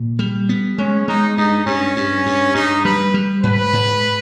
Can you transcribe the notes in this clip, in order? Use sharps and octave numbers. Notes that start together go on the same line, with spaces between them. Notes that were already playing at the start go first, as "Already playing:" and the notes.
Already playing: A#2
G3
B3
G#3 C#4
G#3 D#4
G2 D#4
G2 C#4
G2
G2
G2 D#4
G3 B4
G3
G#2 B4
G#2